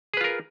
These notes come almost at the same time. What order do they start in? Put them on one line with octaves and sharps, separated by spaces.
G#4 B4 F4 A#4